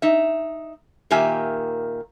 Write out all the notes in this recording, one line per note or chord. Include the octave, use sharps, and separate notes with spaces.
D#4 E5
A#2 D#3 A#3 G4 E5 G#5